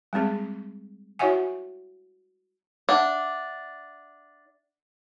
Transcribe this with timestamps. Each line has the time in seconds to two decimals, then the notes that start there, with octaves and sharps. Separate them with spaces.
0.13 G3 G#3 C4 G#4
1.19 E4 F#4 C#5 E5 F#5 G#5
2.89 D4 E5 F#5